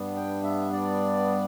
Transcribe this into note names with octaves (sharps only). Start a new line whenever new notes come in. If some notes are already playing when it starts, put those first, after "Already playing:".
Already playing: G2 G3 B3 D4
G5
E5
D5